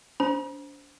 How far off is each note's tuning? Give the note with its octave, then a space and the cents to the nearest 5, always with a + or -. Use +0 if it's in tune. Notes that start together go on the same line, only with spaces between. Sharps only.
D4 -35 C5 +0 A#5 +40